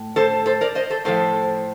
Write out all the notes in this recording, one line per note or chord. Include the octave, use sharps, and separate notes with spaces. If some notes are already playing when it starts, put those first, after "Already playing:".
Already playing: A2
A4 C5
A4 C5
A#4 D5
C5 D#5
A4 C5
A2 F3 A4 C5